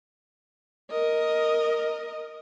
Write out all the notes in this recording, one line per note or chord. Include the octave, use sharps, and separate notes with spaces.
A#4 D#5